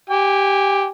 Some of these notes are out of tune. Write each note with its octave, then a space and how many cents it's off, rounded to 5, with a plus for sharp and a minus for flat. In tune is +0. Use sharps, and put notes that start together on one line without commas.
G4 +0 G#5 -25